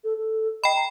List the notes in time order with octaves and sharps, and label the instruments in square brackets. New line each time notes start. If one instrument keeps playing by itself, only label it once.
[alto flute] A4
A4
[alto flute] D#5 [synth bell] G5 B5
[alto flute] A#5